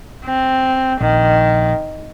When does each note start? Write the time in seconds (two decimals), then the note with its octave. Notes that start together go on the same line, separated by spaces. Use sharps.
0.25 C4
1.01 A#1 D#3